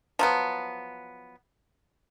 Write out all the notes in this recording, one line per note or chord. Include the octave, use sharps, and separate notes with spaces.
F3 F#3 B3